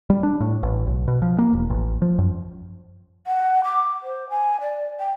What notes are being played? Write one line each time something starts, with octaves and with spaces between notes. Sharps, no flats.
G3
D4
A2
A1
B1
B2
F3
A#3
E1
A1
F3
F#2
F#5
D6
C5
G#5
D5
G5